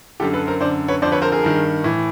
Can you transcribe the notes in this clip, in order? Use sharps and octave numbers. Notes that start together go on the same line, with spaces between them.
F#2 D3 G4 A4
A4 B4
A#4 C5
F#2 D3 C5 D5
B4 C#5
F2 D3 C5 D5
B4 C#5
A#4 C5
G#4 A#4
G2 D#3
A2 E3